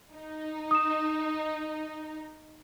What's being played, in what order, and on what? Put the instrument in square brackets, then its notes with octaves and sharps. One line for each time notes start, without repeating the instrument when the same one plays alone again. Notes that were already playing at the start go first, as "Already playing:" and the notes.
[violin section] D#4
[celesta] D#6 E7